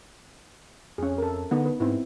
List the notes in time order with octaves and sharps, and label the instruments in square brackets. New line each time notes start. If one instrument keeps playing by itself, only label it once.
[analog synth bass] F2 [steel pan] C#4 G#4
[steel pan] A4 A#4
[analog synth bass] D3 [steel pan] B3 D#4
[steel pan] B4
[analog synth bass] G#2 [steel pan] C4 E4